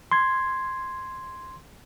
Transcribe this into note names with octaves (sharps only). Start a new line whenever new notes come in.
C6 G#6